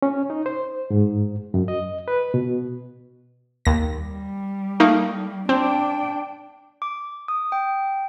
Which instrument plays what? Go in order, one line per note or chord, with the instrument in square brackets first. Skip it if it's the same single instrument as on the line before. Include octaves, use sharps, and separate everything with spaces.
[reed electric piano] C#4
D#4
C5
G#2
F#2
D#5
B4
B2
[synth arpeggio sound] D#2 A#6
[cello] G3
[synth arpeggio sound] A3 A#3 D#4
[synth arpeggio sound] C4 [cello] D4 G5
[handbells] D6
D#6
G5